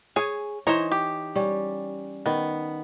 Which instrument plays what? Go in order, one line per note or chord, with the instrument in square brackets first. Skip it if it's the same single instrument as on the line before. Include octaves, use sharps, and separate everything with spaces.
[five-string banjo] G#4 G#5 [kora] C#5
[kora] E3 D#4 C#5 [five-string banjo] C5 A#5
[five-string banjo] G4
[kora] G3 C#4
[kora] D#3 [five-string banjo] B3